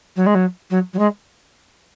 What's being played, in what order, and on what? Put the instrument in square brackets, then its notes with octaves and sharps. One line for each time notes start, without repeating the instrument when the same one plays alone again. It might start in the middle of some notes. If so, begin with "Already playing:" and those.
[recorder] F#3
G#3
F#3
F#3
F#3
G#3